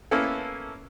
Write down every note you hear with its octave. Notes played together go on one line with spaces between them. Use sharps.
A#3 B3 C#4 E4 A4